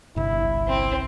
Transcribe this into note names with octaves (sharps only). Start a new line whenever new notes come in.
G1 C2 E4
C4